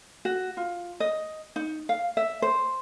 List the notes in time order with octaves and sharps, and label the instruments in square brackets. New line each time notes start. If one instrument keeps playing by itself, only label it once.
[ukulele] F#4
F4
D#5
D#4
F5
E5
C5